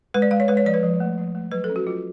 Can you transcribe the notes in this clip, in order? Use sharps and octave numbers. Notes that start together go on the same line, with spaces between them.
G#3 B4
D5
G#3 F5
C#5
G#3 B4
C#5
F3 D5
B4
F3
A3
F3
A3
F#3 B4
A4
C#4
F#4
F#3 F4